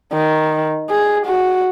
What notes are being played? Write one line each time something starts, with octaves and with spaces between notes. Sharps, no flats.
D#3
G#4
F#4